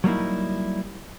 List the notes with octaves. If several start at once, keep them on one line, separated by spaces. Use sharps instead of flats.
F#3 G3 A#3 D#4 E4